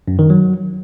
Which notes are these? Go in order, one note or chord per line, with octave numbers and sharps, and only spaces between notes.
F#2
D#3
F#3